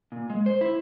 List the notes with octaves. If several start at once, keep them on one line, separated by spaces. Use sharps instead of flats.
A#2
G#3
C5
E4